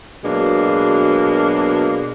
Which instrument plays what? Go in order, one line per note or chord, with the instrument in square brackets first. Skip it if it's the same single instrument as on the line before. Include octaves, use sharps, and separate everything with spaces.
[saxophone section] B2 F#3 G#3 A#3 D4